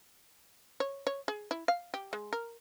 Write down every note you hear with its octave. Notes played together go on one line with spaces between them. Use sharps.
C#5
C#5
G#4
E4
F5
G4
G#3
A#4